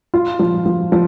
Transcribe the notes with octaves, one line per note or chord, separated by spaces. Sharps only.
F4
F3
F3
F3